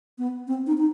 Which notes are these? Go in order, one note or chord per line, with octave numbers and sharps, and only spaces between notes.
B3
C4
D#4
D#4